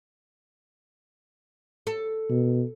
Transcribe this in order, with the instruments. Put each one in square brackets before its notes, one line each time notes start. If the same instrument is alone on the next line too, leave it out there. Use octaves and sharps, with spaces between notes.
[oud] A4
[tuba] B2